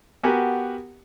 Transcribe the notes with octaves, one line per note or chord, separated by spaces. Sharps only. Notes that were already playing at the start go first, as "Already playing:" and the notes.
B3 F#4 G4 A#4 F#5 G#5